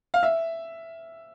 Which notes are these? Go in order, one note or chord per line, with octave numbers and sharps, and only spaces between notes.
F5
E5